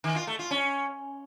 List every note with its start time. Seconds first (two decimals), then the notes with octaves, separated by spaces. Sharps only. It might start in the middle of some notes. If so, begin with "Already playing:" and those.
0.04 D#3
0.16 F4
0.27 A3
0.39 F4
0.51 C#4